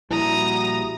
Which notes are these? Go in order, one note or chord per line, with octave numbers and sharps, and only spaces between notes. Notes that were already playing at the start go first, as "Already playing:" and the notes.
A#1 G3 E4 F#4 A#5 D#6